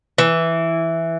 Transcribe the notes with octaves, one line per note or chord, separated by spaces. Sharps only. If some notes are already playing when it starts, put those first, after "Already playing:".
E3